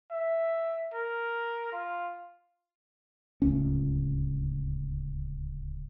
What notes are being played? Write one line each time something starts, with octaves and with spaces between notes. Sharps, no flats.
E5
A#4
F4
D1 C#2 C#4